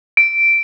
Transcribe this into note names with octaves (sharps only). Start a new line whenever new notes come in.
D7